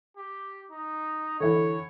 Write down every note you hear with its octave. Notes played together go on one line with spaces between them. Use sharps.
G4
D#4
D3 E3 C#5